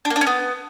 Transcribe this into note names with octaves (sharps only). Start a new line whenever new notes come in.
D4
A#3
D4
C#4
B3